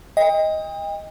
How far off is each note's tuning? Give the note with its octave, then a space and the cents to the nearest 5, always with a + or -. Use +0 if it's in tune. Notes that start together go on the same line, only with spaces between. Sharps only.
D#5 +15 G5 +40